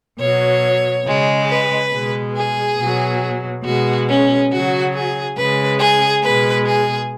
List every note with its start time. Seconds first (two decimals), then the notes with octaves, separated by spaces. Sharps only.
0.19 B2 F#3 C#5
1.06 C#3 G#3
1.48 B4
1.91 B2 G#3
2.35 G#4
2.78 B2 F#3
3.64 B2 G#3 F#4
4.07 C#4
4.50 C#3 F#3 F#4
4.93 G#4
5.36 C#3 G#3 B4
5.79 G#4
6.22 B2 G#3 B4
6.65 G#4